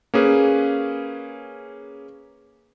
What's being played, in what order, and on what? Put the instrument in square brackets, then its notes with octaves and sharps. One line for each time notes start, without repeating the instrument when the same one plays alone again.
[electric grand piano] A#3 C#4 G#4 B4